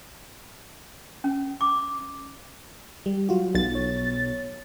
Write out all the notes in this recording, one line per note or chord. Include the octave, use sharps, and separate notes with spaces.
C#4
D6
G3
F#3 F4 F#4
B1 A6
C#5